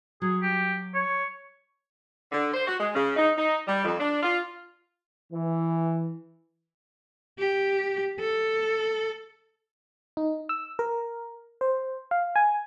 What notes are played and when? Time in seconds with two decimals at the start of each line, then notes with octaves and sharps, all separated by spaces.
0.22 F#3 G#4
0.42 G4
0.95 C#5
2.32 D3
2.54 C5
2.67 F#4
2.80 G#3
2.95 C#3
3.16 D#4
3.38 D#4
3.68 G3
3.85 F2
4.00 D4
4.23 F4
5.32 E3
7.39 G4
8.20 A4
10.17 D#4
10.49 E6
10.79 A#4
11.61 C5
12.11 F5
12.36 G#5